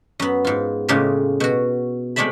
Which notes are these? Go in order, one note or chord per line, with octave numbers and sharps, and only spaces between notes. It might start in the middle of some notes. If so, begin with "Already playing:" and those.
F#2 B3
G#2 F4
A2 C#3 G#3 A#3 F4 G4
B2 F#4
C3 G#3 A3 D5 E5 B5